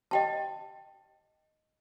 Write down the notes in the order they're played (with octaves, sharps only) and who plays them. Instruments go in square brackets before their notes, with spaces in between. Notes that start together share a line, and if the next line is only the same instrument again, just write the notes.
[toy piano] D#5 G5 A5